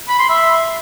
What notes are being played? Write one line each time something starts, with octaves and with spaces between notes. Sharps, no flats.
B5
C6
E5